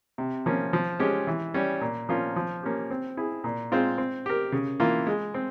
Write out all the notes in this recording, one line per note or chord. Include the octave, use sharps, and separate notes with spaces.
C3
F3 A#3 C#4
F3
G#3 C#4 G4
E3
G3 C#4
A#2
F3 A#3 C#4 F4
F3
A#3 C#4 G4
C4
E4 G#4
A#2
G#3 C4 F4 C5
C4
G4 A#4
C#3
E3 A#3 F4
G#3
C4